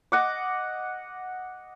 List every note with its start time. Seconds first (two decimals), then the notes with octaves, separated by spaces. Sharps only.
0.12 D#5 F#5 D6